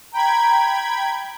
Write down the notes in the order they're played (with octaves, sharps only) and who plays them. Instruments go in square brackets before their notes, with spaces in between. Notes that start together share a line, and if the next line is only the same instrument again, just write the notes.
[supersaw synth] G5 B5 G#6 [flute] A#5